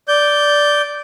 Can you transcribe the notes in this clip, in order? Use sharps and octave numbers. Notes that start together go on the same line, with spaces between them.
D5 G6